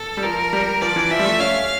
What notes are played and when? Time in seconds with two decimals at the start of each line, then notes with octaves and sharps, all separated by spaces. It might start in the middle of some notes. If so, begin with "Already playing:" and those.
Already playing: A4
0.17 G3
0.23 F3 A#4
0.53 G3
0.81 F3 D5
0.96 E3
1.11 F3 E5
1.19 G3
1.26 A3
1.40 C#4 F5